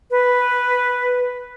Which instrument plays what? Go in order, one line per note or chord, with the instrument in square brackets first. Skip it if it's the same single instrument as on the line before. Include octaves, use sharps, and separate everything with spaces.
[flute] B4